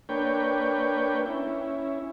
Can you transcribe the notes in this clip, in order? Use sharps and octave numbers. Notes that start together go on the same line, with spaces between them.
A#3 D4 B4 C#5 G5
C#4 E4